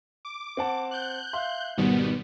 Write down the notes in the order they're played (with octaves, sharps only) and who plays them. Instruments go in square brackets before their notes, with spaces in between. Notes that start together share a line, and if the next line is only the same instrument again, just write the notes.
[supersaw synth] D6
[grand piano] C4 F#5 A5
[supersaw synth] F#6 G6
[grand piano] E5 F5 C6
[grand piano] G#1 B2 [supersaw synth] D#3 G3 B3